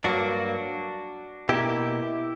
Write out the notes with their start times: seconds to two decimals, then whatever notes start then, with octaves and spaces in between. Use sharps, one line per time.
0.04 G2 F#3 A#3 D4 F#4
1.49 B2 A#3 E4 G4